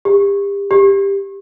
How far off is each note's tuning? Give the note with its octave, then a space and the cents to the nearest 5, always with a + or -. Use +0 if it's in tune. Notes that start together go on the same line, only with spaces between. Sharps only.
G4 +35
G4 +15